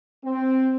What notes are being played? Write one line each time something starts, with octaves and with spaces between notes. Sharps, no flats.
C4